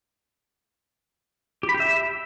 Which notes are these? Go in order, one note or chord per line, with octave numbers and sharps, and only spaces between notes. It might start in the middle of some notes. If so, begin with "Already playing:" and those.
G4
B5
G4
E5